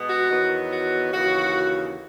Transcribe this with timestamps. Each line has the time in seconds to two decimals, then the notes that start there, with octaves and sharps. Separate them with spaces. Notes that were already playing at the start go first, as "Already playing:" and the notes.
Already playing: B2 G#3 B3
0.08 F#4
0.29 E2 D#3 F#3 B3
0.71 F#4
1.12 D#2 C#3 E3 F#4